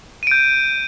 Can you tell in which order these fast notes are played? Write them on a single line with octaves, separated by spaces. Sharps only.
D#7 D7 G6